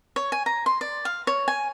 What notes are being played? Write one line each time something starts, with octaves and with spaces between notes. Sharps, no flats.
C#5
G#5
A#5
C6
D5
F5
C#5
G#5